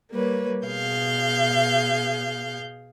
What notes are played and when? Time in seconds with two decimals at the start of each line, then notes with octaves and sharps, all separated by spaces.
0.12 G3 A#3 B4 C#5
0.65 B2 G#4 F5 G6